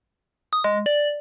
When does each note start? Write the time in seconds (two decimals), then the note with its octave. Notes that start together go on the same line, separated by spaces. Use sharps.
0.53 D#6
0.64 G#3
0.86 D5